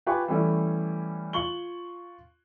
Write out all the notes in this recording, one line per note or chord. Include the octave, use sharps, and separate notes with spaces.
F4 G4 B4 G#5 B5 C#6
E3 G3 A3 C#4 E4
F4 C#6 F#7 G7